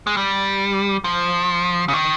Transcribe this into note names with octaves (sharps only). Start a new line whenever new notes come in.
G#3
G3
F3
C#3
D#3